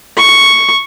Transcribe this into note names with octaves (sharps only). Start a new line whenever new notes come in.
C#6